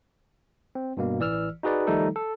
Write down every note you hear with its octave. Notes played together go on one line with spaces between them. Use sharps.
C4
G2 B2 A#3
A1 E3 D5 E6 F6
D#4 F#4 G#4 B4 D5
D#3 F3 G3 A3 D#4 A4
A4